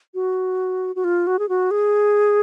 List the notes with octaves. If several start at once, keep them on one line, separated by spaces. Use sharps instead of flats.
F#4
F#4
F4
F#4
G#4
F#4
G#4